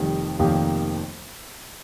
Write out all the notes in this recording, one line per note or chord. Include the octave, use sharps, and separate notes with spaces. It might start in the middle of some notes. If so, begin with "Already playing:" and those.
Already playing: F1 F2 D#3 G3
F1 F2 D#3 A#3 G4